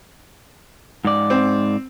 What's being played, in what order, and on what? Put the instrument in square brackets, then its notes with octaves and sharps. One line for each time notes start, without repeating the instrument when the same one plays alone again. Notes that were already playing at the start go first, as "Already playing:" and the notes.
[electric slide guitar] G#2 D5
[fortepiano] C4